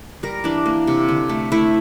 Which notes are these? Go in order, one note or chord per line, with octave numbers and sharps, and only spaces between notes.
G3 A#4
E3 D4
A#3
C3
D3
A3
A3 E4